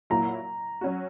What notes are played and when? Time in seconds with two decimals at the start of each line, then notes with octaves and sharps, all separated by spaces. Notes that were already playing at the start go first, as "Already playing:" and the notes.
0.10 A#2 F#3 A#3 E4 A#5
0.81 F#3 C#4 F#4